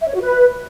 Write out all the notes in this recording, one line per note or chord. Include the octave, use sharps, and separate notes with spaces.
E5
C#5
F#4
B4